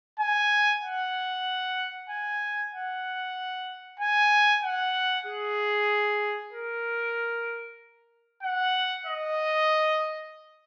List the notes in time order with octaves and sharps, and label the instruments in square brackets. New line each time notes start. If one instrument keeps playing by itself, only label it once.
[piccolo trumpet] G#5
F#5
G#5
F#5
G#5
F#5
G#4
A#4
F#5
D#5